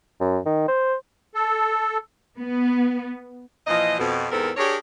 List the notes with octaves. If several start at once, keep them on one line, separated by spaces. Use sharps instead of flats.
F#2
D#3
C5
A4
B3
A#2 E3 F3 D#5
F2 B2
E2 G#2 B3 C4 A4 A#4
D4 G4 G#4 A#4 C#5